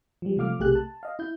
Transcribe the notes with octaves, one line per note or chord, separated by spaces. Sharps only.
F3 G3
C3 F3 A3 F5 D6 F6
B1 C3 A3 G4 G#4 F#6
A5
D#5 F5
E4 G6